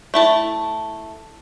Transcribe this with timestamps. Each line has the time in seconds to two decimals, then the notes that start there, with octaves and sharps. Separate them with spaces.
0.14 A3 E4 A5